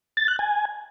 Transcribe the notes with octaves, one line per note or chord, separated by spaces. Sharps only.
A6
F#6
G#5